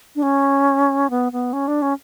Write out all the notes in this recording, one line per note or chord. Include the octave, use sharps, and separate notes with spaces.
D4
C#4
B3
B3
C#4
D4
C#4